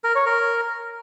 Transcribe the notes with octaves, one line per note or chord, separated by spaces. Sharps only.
A#4
C#5
A#4